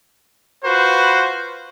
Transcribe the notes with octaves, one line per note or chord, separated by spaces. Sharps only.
F4 F#4 B4 C5